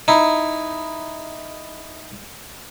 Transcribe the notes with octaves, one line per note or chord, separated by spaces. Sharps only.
D#4 E4